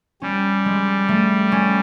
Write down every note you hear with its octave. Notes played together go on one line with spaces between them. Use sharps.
G3 C#4
G#3
A3
C#4